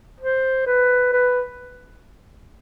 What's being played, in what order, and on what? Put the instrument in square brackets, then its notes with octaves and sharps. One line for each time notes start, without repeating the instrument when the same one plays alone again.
[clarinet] C5
B4
B4